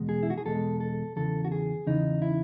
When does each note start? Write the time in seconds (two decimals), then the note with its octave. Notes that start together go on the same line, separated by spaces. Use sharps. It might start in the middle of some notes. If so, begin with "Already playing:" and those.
Already playing: E2 B2 G#3
0.09 G#4
0.23 E4
0.30 F#4
0.38 G#4
0.45 E2 B2 G#3 A4
0.80 A4
1.16 E2 C#3 E3 A4
1.45 F#4
1.52 G#4
1.86 E2 C#3 E3 D#4
2.22 E4